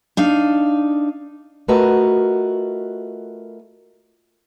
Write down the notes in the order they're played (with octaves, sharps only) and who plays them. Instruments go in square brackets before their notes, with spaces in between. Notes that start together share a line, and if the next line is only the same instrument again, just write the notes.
[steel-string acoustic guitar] D4 D#4 F5
A3 F4 F#4 A#4 B4 D#5